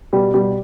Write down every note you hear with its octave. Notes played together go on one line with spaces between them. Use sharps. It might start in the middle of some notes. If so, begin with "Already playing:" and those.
B2 G3 G4
B2 G3 G4